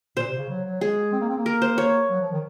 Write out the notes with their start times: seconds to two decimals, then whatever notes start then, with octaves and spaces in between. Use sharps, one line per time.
0.17 A#2 C5
0.27 C3
0.38 C#3
0.49 F#3
0.64 F#3
0.81 G#3 G#4
1.13 C4
1.21 A#3
1.29 C4
1.38 A#3
1.46 A#4
1.62 C5
1.78 C#5
2.10 F#3
2.21 F3
2.32 D#3